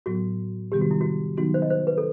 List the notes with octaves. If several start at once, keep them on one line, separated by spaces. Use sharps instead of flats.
A2 F#3 B3 F#4
C3 D#3 G3 B3 G4
F#4
E4
F#4
D#3 F#3 B3 D#4 F#4
C5
D#5
C5
B4
A4